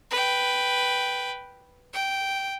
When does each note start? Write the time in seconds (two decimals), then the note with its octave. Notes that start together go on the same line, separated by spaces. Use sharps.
0.11 B4 G5
1.93 G5